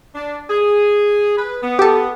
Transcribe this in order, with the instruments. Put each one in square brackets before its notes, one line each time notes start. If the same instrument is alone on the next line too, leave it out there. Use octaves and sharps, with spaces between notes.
[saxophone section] D4
G#4
B4
B3
[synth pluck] G4 A4